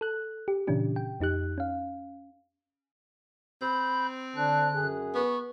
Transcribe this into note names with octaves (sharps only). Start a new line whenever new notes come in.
A4 F#6
G4
A#2 C#3 E3 C#4 D4 G4
G5
F2 D#4 G4 F#6
C#4 F5
C4 B5 G6
D3 D4 F#6
F#2 G#4
B3 C#6